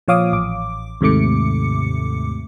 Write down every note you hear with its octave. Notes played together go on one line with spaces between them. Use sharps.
A#2 F3 C#5 F5 D6 D#6
A1 D6
D#2 G#2 C3 A3 D6 C#7